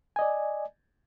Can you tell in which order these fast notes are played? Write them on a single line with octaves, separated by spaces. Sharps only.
G#5 D#5 D5